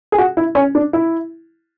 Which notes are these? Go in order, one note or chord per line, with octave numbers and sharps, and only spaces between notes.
G#4
F#4
E4
C#4
D4
E4